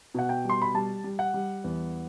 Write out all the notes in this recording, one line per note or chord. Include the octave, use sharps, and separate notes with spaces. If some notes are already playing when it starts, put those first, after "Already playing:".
B2 F#5
G5
G3 C6
B5
G3 A5
G3
F#5
G3
E2